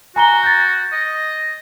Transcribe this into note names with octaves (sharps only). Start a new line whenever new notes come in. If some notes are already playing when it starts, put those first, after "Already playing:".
F#4 G#5 A#5 G7
G6 A6
D#5